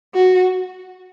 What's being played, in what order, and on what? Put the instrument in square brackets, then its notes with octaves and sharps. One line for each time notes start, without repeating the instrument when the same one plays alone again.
[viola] F#4